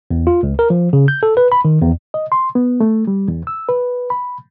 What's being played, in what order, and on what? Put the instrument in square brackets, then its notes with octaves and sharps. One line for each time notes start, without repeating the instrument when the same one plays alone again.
[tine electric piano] E2
F4
C#2
A#4
F3
C#3
G6
A4
B4
B5
D#3
E2
[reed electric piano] D#5
C6
B3
A3
G3
E2
E6
B4
B5